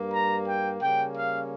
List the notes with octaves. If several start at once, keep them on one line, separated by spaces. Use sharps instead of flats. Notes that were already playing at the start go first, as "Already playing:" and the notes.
Already playing: G2 G3 A#3
A#5
G5
C#3 G3 A#3 C#4 G5
F5